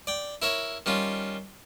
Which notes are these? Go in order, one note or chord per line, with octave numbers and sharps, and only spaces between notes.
D5 G5
E4 A#4 C#5 E5
D#3 G3 C#4 F4